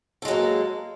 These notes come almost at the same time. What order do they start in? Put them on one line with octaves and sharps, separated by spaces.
A4 G#3 F#3 A#3